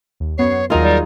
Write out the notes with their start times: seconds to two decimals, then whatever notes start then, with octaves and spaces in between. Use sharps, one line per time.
0.20 D#2
0.38 F#2 B3 C#5 C7
0.70 D#2 F#3 D#4 F4 G#4 A#4
0.83 G3